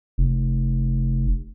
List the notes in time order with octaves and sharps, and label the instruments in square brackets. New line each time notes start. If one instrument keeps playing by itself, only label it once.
[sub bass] F1